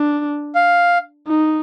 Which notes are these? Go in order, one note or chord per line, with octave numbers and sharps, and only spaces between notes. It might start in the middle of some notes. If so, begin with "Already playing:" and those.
Already playing: D4
F5
D#4